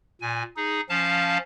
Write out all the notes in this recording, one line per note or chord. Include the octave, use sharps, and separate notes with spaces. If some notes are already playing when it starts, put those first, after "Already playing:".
A#2 G#5
D#4 G#4
F3 C#4 F5 A5